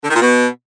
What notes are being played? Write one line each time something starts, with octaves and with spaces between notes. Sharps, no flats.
D3
D#3
A#2
B2